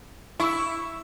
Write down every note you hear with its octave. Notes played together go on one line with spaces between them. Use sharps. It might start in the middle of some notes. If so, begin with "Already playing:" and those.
E4 C#6 E6